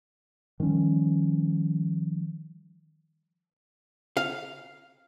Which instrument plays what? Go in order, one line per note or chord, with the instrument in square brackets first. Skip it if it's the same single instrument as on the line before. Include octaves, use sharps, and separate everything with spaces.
[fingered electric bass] D#3 F3 G3 C#4
[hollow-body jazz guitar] F5